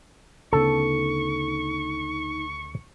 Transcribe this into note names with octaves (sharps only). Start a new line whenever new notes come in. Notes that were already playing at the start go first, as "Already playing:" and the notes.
D2 C#3 B3 D#4 A4 C#6